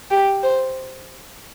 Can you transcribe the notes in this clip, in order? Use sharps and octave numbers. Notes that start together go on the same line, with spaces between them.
G4
C5